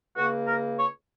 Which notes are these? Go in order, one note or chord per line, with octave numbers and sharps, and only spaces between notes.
C#2 C#3 A#3 F#4
A#4
C#5